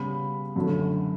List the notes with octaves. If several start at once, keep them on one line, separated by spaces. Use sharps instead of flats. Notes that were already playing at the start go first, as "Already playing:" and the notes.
Already playing: C#3 G3 B3 B5
F#2 D3 A3